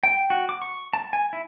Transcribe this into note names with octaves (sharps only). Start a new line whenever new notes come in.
G5
F#4
D6
C#6
A5
G#5
E4